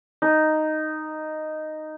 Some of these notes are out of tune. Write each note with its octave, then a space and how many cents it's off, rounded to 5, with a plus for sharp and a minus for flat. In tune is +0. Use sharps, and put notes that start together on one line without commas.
D#4 -5